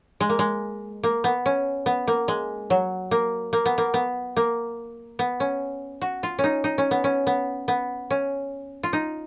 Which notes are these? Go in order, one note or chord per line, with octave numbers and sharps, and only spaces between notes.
G#3
A#3
G#3
A#3
B3
C#4
B3
A#3
G#3
F#3
A#3
A#3
B3
A#3
B3
A#3
B3
C#4
F#4
F4
C#4
D#4
D#4
C#4
B3
C#4
B3
B3
C#4
F4
D#4